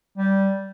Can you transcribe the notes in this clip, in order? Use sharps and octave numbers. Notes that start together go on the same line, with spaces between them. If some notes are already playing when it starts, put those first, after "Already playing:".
G3